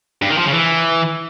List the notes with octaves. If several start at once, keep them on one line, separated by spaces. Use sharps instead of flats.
G2
D#3
F3
C#3
E3